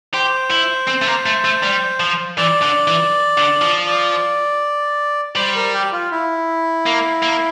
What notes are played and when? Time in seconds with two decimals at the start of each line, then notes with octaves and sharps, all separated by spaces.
0.14 G4 C5
0.51 E4
0.88 C4
1.02 A3
1.07 A#3
1.26 A3
1.45 A3
1.63 G3
2.00 F3
2.38 E3 D5
2.62 D3
2.87 E3
3.38 D3
3.62 F3
3.87 D5
5.36 G3 C5
5.55 A#4
5.73 G4
5.92 F4
6.11 E4
6.86 A#3
7.22 A#3